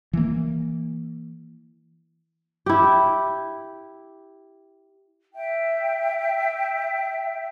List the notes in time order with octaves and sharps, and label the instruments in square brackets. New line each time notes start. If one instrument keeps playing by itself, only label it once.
[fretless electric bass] E3 A#3
[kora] E4 G4
[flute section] E5 G5